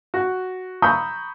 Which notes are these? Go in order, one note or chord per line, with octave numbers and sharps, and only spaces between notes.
F#4
A#5 B5 C#6 D#6 E6 G6